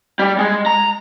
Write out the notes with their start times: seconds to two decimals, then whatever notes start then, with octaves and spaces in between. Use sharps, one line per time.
0.19 G3
0.39 G#3
0.66 A#5